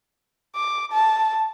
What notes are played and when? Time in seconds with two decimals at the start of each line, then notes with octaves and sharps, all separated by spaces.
0.55 D6
0.92 A5